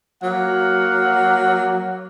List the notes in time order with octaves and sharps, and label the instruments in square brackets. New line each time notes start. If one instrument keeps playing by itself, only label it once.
[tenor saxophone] F#3 [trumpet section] A#3 F5 F#5